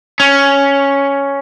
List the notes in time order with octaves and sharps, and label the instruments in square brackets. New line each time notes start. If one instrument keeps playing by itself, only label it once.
[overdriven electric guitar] C#4